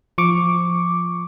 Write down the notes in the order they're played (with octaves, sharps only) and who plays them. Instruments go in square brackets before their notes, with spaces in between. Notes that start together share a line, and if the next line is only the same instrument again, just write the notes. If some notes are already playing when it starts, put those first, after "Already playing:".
[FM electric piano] F3 C#6 D6